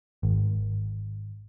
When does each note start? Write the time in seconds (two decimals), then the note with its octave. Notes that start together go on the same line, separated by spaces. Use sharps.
0.23 G#1